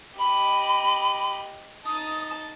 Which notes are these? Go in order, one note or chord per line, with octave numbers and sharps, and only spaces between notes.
G4 D#5 B5
D#4 A5 D#6